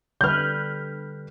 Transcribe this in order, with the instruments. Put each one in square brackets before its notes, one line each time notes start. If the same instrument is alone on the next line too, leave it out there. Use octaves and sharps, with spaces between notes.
[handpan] D3 G3 B4 [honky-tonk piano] F6 G6